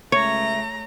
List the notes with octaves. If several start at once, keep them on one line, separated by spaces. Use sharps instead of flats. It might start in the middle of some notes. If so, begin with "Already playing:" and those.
C#2 A3 C#5 E5 A#5